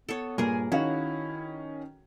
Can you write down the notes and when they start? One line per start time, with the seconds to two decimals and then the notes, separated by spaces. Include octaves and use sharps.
0.09 B3 A4 C#5
0.38 G2 A#2 G#4 A#4 G#5
0.72 D#3 C#4 E4 F#4 C#5 F5